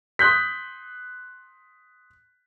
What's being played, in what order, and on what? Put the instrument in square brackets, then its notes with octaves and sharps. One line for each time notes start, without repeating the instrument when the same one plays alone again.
[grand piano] C6 D#6 F#6 G6 B6